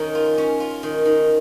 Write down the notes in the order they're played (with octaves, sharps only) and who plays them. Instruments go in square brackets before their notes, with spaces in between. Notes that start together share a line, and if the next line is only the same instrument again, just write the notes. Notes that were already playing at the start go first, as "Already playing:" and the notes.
Already playing: [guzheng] D#3 C#4 A#4 C#5 D#5
F4
C#4
F4
D#3
D#3